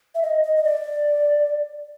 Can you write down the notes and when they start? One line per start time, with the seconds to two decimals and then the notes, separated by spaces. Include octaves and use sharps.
0.15 E5
0.22 D#5
0.43 D#5
0.56 D#5
0.64 D5